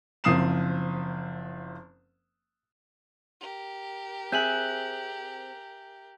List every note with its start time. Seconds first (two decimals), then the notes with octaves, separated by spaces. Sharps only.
0.24 F#1 F3 C4 D#6 C7 E7
3.40 G4 A#4
4.32 C4 G#4 E5 G#5 F#6 G6 F#7